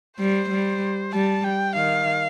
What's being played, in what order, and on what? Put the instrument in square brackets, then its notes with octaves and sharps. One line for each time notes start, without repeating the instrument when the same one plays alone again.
[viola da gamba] G3 [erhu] C5
[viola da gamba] G3
[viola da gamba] G3 [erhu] A5
[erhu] G5
[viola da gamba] D#3 [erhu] F5